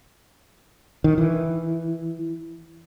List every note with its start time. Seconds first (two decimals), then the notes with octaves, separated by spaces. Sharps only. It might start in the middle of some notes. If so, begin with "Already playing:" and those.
1.04 D#3
1.18 E3